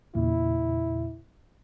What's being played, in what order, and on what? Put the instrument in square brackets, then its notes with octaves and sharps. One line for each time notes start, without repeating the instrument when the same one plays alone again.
[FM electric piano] E2 A#2 C#3 [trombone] E4